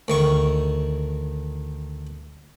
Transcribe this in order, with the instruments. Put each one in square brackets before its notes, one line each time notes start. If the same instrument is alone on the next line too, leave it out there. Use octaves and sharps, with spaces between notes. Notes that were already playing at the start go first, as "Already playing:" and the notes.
[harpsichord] D2 D#3 C#6